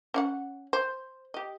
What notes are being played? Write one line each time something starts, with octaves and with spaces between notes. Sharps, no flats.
C#4 F5 F#5
C5
G4 D#5